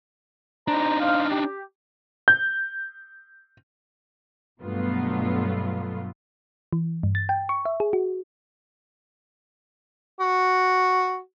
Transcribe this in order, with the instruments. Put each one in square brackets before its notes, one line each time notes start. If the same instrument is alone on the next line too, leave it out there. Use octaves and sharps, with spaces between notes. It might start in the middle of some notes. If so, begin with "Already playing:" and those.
[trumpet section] G3 C5 A#5 [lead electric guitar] D4 D#4
[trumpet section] C5 F5
G4
[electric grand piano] G6
[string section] G2 B2 F#3 A3 B3 F4
[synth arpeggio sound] E3
G2
A6
G5
C#6
E5
G#4
F#4
[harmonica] F#4